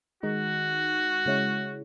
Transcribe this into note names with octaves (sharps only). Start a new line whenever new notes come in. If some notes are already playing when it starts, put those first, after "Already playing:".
D#3 G#3 D#4 F#4
C#3 G#3 C#4 E4